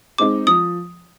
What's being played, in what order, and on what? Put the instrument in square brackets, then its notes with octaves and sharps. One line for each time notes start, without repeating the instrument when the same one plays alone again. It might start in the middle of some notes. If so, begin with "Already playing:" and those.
[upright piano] G#3 C4 D#4 [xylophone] D6
[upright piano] F3 [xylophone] D#6